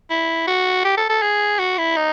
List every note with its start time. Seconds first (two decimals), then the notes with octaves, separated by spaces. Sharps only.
0.10 E4
0.47 F#4
0.84 G4
0.97 A4
1.09 A4
1.22 G#4
1.59 F#4
1.78 E4
1.97 D#4